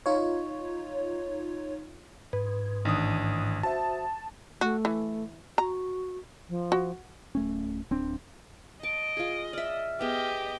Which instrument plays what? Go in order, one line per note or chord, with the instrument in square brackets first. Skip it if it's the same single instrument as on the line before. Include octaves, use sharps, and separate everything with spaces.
[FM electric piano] D#4 F4 C#5
[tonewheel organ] G#2 [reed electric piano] B4
[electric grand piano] A1 D4 D#6 [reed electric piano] D#3
[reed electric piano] F#4 C5 E5 [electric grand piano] A5
[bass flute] A3 [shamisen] F#4
[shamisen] E3
[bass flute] F#4 [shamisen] A#5
[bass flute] F3
[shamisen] F#4
[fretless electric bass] D1 A3 C#4
D1 C4 D4
[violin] D#5 [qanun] A5 [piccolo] D7
[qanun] F4 G#4
[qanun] D5 E5 [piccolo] F6
[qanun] B3 G#4 [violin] G4 D#5